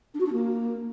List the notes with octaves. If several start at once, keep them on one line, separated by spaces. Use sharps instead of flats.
D4
F#4
D4
A#3